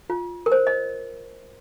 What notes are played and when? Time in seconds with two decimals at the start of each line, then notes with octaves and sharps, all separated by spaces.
0.10 F4
0.46 A#4
0.52 C5
0.67 D#5